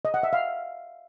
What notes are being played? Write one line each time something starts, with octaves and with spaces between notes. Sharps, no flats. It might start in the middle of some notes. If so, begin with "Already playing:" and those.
D#5
F#5
E5
F5